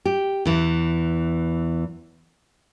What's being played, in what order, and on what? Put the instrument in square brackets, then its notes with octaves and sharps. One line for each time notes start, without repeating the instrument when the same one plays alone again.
[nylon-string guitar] G4
E2 E3